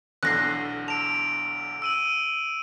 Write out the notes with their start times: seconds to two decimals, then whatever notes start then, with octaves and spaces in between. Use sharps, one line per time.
0.23 B1 E2 D3 F#6 A#6 C7
0.88 A5 E6 D7 F7
1.82 E6 D#7 F#7